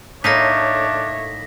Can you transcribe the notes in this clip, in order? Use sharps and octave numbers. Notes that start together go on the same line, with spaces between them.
A2 A#3 D4 D#4 C#5 E5 A#6 B6